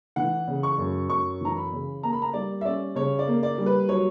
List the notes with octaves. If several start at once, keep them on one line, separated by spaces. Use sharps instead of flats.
E3 F#5
C#3
C#6
F#2
F#2 C#6
E3 A#5
B5
C#3
A#3 A#5
B5
A#5
G3 D5
E5
C#4 D5
C#3 C#5
D5
A#3
D5
G3
B4
F#3 C#5